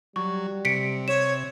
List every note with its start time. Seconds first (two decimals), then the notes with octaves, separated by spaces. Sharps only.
0.16 F#3 G3 C#6
0.65 C3 B6 C#7 D7
1.08 C#5 E7